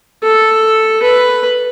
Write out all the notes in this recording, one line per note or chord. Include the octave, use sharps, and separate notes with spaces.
A4
B4